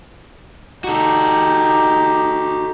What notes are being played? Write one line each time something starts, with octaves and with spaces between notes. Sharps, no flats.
D#4 F#4 G4 A4